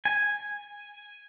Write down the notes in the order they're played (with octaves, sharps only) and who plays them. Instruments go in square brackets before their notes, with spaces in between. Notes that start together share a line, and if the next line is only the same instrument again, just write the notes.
[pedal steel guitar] G#5